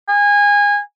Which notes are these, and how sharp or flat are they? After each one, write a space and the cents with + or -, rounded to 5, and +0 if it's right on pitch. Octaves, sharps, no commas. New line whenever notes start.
G#5 -25